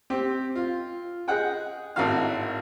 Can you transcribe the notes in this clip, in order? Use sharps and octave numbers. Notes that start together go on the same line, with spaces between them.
C4 G4
F4
G#4 D#5 F#5 G5
G#1 A2 D#3 F#4 F5